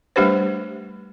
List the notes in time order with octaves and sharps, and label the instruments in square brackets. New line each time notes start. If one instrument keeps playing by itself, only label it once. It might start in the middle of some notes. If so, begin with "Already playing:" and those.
[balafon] G3 A3 D4 G4 B4 C5